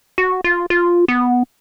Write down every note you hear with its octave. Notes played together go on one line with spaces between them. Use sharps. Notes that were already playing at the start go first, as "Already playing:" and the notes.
F#4
F4
F4
B3